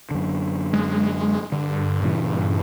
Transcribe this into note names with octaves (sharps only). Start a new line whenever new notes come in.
F#2 D3
G#3
G2 D3
A#2 C#3 E3